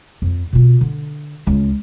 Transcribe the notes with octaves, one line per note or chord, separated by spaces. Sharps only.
F2
B2 F4
D3
C#2 F4